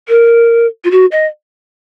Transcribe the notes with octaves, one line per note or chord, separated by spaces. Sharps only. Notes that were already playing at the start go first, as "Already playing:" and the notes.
A#4
F4
F#4
D#5